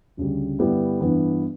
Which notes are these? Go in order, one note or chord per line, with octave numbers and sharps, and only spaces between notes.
D2 C#3 G3
G2 D3 G3 B3 E4
G2 E3 B3